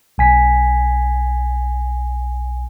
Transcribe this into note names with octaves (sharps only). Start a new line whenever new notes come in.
B1 G#5 B6